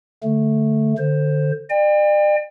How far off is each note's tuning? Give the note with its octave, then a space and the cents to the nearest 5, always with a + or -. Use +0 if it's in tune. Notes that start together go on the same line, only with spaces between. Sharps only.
D3 -5 A3 +0
D3 +20 C5 +10
D5 +40 G5 +35